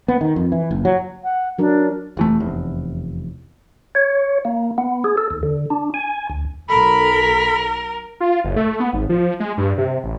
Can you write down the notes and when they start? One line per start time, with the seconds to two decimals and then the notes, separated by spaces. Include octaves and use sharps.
0.08 B3
0.21 D#3
0.36 F2
0.52 E3
0.71 F#1
0.85 F#3
1.23 F#5
1.59 F#3 D4 A#4
2.17 F1 E3 A3
2.40 F1 E2
3.95 C#5
4.45 A#3
4.78 B3
5.04 G#4
5.17 A4
5.31 D#2
5.43 D3
5.70 D4
5.94 G#5
6.30 D2
6.69 B1 A4 A#4 B5
8.20 F4
8.44 F#1
8.56 A3
8.80 B3
8.93 G#1
9.09 F3
9.40 G#3
9.58 G2
9.78 C3
10.04 A1